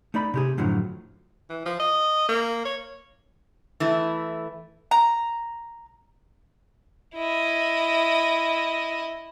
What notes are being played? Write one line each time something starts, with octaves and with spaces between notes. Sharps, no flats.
A3 D#4 D5 B5
C3 G4 G#4
F#2 A2 D3 F3 F#3
E3
F3
D#5
A#3
C#5
E3 A3 E4
A#5
E4 D#5